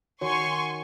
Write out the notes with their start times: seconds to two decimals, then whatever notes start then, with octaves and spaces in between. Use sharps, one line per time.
0.21 D#3 F#4 C#5 G#5 C6 C#6